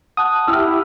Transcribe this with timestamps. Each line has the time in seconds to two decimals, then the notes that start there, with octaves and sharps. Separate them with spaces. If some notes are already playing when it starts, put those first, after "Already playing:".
0.17 F#5 A5 D#6 F#6
0.47 E4 G4 E6 F6